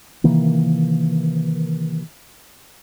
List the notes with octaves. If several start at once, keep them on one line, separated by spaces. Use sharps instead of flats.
C3 D#3 E3 A#3